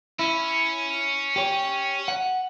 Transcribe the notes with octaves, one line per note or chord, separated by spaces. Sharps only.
C#4 E4
G4 C#5
F#5